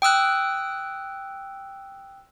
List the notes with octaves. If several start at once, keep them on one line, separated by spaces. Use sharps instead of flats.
G5 D#6 E6 F#6